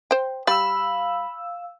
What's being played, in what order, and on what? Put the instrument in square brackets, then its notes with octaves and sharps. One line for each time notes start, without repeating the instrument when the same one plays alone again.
[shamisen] C5 G5
[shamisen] G3 [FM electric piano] F5 E6 [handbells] B5